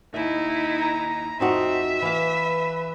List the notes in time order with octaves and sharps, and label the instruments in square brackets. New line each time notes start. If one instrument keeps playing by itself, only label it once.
[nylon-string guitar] D#2 E5 [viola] D#4 E4
[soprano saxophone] A#5
[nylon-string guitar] F2 D#4 F#4 [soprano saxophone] C4 [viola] E5
[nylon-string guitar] E3 F5 [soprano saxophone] B4